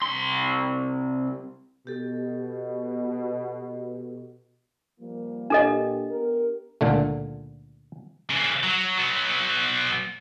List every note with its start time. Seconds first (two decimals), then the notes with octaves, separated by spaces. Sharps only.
0.02 C2 C6
1.87 B2 G4 A4
5.00 F3 G3 A#3
5.50 A#2 D4 G4 A4 D#5
6.10 B3 G4 A#4
6.81 C#2 A#2 D3 A3
8.30 C#3 E3
8.63 F#3
8.98 F#3 B3